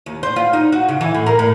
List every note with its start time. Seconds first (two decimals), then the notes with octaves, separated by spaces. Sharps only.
0.06 D#2
0.23 C5
0.36 F4
0.53 D#4
0.72 F#4
0.89 C#3
1.01 E3
1.14 A2
1.26 A#4
1.39 A2